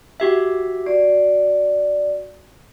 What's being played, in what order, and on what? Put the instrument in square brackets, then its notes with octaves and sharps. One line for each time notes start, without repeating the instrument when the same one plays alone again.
[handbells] F#4 G4 E5
[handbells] F#4 [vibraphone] D5